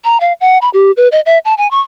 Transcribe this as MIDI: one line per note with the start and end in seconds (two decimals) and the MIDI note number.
0.05 0.20 82
0.21 0.33 77
0.41 0.58 78
0.62 0.69 83
0.74 0.91 67
0.97 1.08 71
1.12 1.20 75
1.26 1.38 76
1.45 1.54 81
1.58 1.70 80
1.71 1.80 85